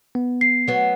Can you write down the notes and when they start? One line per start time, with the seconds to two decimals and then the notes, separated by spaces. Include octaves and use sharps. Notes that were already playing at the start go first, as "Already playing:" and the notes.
0.15 B3
0.41 C7
0.68 F#3 B3